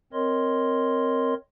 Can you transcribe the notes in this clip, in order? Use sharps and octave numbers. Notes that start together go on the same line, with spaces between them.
C4 A#4 C#5 D#5 C6